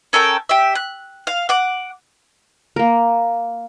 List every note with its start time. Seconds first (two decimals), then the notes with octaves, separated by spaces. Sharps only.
0.13 C#4 A4 A#4 G5
0.49 G4 E5
0.75 F#6
1.27 F5
1.49 F#5 D6
2.76 A#3 A#4